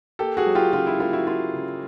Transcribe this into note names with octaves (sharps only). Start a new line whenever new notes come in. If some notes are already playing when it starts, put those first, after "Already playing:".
A#3 G4 A4
F#4 G#4
F#3
F4 G4
C#3 F4
E4
A#3 F4
E4 F#4
A#3 F4
C#3